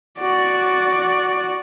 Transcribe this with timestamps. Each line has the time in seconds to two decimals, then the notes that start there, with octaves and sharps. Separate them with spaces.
0.20 F#4 D5